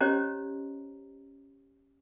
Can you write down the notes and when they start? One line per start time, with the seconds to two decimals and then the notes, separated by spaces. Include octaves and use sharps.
0.01 C#4 G4 C5 C#5 D#5 A#5